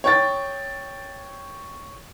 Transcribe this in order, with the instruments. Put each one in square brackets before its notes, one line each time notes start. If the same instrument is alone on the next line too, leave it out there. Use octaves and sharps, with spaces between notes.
[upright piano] C#5 G5 A6